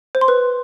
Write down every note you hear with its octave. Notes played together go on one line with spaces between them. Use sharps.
C5
C6
B4